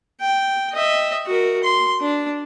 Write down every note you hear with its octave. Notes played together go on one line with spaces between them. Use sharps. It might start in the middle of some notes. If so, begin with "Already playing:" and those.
G5
D#5 E5
F#4 A#4
C6
D4